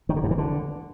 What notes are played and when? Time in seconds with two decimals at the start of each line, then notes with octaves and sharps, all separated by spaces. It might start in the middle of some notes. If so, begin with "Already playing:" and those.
0.09 D#3
0.16 D3
0.24 G2
0.31 E3
0.38 D3